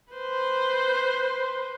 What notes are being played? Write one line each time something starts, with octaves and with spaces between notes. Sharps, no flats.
B4 C5